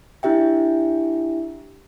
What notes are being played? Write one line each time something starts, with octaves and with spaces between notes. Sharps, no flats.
D4 E4 G4 E5 G5